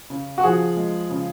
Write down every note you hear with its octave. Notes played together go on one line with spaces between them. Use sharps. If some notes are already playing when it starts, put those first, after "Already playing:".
C#3
F#4
F3 G#4
G#3
C#3